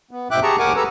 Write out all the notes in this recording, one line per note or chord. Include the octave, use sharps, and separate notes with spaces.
B3
G#2 B2 E5 G5 D6 F#6
G4 G#4 A5 A#5 C#6
D#2 A#4 F#5 G#5 C#6 D6
G4 A4 B4 A#5 E6